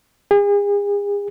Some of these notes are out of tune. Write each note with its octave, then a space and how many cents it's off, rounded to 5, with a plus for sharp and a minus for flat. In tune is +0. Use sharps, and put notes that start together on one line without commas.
G#4 -40